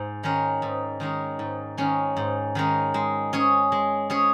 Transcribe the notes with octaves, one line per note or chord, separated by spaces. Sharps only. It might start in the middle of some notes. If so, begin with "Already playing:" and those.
Already playing: G#2
D#3 G#3 C#4 A#4
G#2
D#3 G#3 C#4 A#4
G#2
D#3 G#3 C#4 A#4
G#2
D#3 G#3 C#4 A#4
G#3
C#4 G#4 C#5
G#3
C#4 G#4 C#5